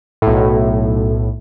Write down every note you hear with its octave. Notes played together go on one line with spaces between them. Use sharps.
B1 A2